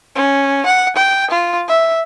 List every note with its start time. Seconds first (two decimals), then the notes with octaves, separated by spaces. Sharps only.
0.15 C#4
0.66 F#5
0.96 G5
1.31 F4
1.68 E5